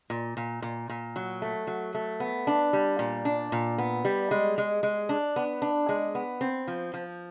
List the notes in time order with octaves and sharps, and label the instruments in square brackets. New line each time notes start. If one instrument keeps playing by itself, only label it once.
[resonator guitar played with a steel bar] A#2
A#2
A#2
A#2
F#3
A3
F#3
A3
B3
D4
G3
A#2
D4
A#2
B3
G3
G#3
G#3
G#3
D4
B3
D4
G#3
B3
C4
F3
F3